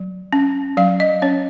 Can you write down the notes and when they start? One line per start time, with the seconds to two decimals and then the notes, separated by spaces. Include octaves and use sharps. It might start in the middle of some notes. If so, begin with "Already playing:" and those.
Already playing: F#3
0.33 C#4
0.77 F#3 F5
1.00 D#5
1.22 C#4 C#5